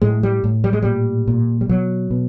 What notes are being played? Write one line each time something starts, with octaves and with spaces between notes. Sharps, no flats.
A2 G#3
G3
A2
G3
G#3
A#2 G3
A#2
G3
B2 F#3
B2